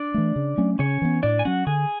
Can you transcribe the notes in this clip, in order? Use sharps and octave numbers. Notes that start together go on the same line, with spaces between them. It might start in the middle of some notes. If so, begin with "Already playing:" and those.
Already playing: D4 D5
E3 A3
C#3
F#3 A3 C#4
C#3 C#4 C#5
E3 B3
A2 D4 D5
G#5
F#3 C#4 F#4 F#5
D3 G#4 G#5